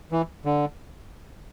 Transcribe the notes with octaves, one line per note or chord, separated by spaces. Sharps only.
E3
D3